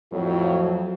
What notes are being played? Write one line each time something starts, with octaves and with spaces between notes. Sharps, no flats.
F2 A2 F3 F#3